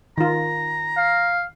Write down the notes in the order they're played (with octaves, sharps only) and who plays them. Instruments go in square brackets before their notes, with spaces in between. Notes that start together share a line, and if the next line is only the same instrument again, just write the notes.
[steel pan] D#3 F4 [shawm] A#5
[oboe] F5